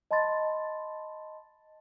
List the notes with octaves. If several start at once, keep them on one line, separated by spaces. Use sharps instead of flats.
D#5 A5 B5 C6 A6